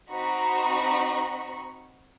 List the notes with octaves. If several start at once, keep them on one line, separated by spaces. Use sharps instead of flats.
C4 D#4 F#4 A#5 B5 C#6